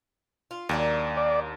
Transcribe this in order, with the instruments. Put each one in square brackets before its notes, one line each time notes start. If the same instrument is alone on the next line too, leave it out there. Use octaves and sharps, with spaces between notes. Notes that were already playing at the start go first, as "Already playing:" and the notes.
[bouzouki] F4
[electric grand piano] D#2 [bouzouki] F#3 A#3 D4
[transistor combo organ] D5